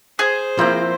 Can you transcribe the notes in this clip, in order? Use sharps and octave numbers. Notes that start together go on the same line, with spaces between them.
G#4 C5
F3 A#3 C4 E4 G5